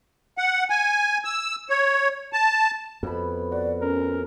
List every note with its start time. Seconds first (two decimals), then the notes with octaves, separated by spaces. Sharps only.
0.38 F#5
0.70 G#5
1.25 E6
1.69 C#5
2.33 A5
3.03 F2 B2 B5
3.52 F#4 D5
3.82 C#4 A#4